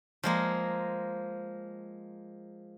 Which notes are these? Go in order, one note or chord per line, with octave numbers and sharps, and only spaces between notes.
F3 G#3 A#3